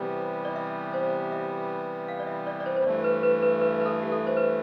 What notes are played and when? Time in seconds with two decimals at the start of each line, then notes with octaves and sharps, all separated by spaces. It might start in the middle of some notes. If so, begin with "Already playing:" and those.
Already playing: C3 E3 G3 B3 C5
0.45 D5
0.56 E5
0.94 C5
1.32 E5
2.08 F5
2.20 D5
2.27 E5
2.47 D5
2.60 D5
2.66 C5
2.76 C5
2.84 G2 E3 A3 D5
3.04 B4
3.23 B4
3.42 B4
3.61 B4
3.81 B4
3.86 A4
4.02 G4
4.12 A4
4.27 C5
4.37 B4